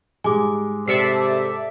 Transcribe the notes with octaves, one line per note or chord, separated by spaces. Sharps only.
G#2 G3 G#3 G#5 D6
C3 A4 D5 E5 C7 C#7